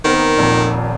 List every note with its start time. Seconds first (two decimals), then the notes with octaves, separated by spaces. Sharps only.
0.05 D#3 B3 C4 A#4
0.37 D#1 F2 A#2